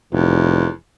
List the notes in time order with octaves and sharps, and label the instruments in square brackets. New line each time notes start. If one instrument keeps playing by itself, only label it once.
[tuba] F1 [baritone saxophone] E2